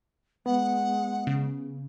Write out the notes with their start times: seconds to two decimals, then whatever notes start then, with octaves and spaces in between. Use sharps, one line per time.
0.46 G#3 B3 F#5
1.27 C#3